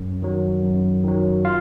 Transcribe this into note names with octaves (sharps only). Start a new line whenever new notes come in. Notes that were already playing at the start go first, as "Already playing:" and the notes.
Already playing: F#2
D#3 F#3
F#2
D#3 F#3
F4 F5